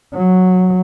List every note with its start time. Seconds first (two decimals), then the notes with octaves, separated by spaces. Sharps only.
0.13 F#3